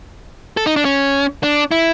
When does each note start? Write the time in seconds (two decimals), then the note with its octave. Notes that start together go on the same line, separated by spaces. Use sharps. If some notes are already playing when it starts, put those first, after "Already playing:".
0.57 A4
0.67 D#4
0.76 D4
0.85 C#4
1.43 D4
1.71 E4